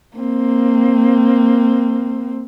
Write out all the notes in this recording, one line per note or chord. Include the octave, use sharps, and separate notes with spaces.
A#3 C4